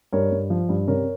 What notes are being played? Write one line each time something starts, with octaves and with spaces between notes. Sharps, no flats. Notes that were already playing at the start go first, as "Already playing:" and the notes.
G2 A#4 C#5
G2
F3
G2
C3 A#4 C#5